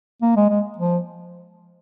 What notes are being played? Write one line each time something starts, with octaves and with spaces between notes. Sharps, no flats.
A#3
G#3
G#3
F3